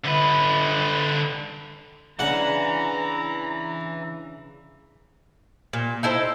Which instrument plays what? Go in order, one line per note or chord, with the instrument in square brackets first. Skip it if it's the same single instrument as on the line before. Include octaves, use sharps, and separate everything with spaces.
[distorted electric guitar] D3 B4
[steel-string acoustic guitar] C#3 D4 [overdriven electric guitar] E3 [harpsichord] F#5 [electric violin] A#5
[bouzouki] A#2
D#4 E4 A4 C5